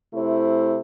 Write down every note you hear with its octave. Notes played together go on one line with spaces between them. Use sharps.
C3 A3 E4 C5